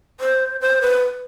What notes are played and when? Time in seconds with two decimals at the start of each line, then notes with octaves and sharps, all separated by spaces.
0.20 C5
0.61 C5
0.81 B4